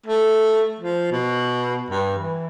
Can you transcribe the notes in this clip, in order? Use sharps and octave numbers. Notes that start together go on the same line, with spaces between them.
A3
F3
B2
G2
E3